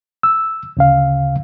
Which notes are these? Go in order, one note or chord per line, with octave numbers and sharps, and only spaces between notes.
E6
D2 C#3 F5